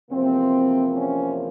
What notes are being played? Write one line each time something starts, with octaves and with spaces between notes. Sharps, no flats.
E2 C3 F3 A#3 C4
C#4